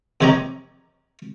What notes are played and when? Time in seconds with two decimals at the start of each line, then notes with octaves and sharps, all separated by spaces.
0.21 F2 C3 G4 C#5 D#5 A#5